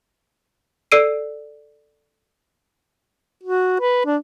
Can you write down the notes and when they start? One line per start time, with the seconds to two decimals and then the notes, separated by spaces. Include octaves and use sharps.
0.92 A4 D5 E6 C7 D7 D#7
3.43 F#4
3.80 B4
4.05 D4